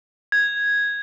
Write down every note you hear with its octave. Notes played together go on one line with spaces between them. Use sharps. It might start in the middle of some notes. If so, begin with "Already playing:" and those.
G#6